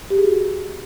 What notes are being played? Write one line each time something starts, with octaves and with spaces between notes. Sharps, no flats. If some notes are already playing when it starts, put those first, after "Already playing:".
G4
G#4
F#4